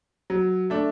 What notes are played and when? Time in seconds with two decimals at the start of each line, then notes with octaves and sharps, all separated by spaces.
0.30 F#3
0.70 A3 D4